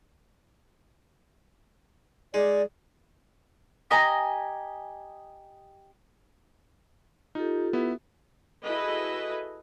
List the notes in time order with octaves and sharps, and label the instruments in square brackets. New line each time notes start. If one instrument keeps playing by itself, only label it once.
[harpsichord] G#3 D#4 G#4 [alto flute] D5
[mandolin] G4 D#5 G#5 A#5
[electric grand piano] D#4 [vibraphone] F4 G4 A4
[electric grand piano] B3 E4 E5
[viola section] E4 F#4 G#4 A4 B4 D#5